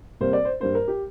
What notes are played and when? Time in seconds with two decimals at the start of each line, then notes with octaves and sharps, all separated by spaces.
0.21 C3 G3 A#3 C5
0.33 D5
0.45 C5
0.60 G2 G3 A#3 C5
0.75 A#4
0.88 G4